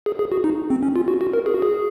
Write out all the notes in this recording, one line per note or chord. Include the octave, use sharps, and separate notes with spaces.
G#4
G#4
F#4
D#4
C4
C#4
F4
F#4
F#4
A#4
G#4
F#4
G#4